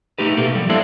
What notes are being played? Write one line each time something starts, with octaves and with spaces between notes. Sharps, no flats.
A3 D#4 G4 B4
B2 A3 A#3
F3 G3
A#3 D4 E4 A4 C5 E5